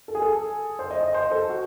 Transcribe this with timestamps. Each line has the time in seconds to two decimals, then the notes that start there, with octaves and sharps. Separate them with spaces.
0.08 A4
0.15 G#4
0.22 A4
0.79 C5
0.91 D#5
1.03 D#5
1.14 C5
1.31 A4
1.49 F#4